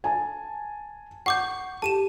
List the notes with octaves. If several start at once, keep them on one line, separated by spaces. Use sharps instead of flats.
G#5 A5
F#5 C#6 D6 G6
G4 A5 D#7 E7